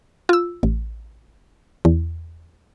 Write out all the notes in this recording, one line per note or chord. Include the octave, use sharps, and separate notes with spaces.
F4 E6
A1
E2